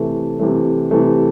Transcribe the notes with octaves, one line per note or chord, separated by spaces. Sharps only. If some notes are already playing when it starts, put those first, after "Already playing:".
Already playing: C3 E3 A3
C3 E3 A3
C3 E3 A3